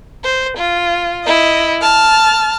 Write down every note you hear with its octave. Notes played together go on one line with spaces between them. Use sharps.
C5
F4
E4 D#5
A5 F6